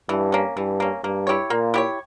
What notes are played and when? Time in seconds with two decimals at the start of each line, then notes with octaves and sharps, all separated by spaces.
0.09 G2 E3
0.32 A#3 C#4
0.57 G2 E3
0.80 A#3 C#4
1.04 G2 A#3
1.27 E4 G4 C#5
1.50 A#2 A#3
1.74 E4 G4 C#5